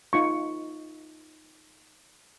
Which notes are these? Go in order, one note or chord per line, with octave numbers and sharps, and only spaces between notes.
D#4 F4 C#6